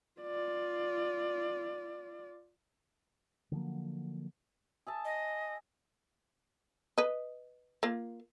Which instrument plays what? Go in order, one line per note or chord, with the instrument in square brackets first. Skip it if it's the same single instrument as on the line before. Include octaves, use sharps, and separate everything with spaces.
[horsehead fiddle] F4 D5
[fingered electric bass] D3 F3 F#3 A#3
[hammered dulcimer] G#4 E5 A5
[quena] D#5
[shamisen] B4 D#5
A#3 F4